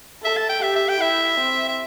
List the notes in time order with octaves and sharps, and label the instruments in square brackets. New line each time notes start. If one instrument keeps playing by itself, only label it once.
[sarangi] A4 [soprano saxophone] E5
[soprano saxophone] A5
G5
[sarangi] G4 [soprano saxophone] E5
[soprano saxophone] E5
G5
[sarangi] E4 [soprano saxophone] E5
[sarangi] C4
[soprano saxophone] E5